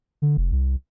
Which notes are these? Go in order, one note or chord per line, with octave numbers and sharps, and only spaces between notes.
D3
F1
C2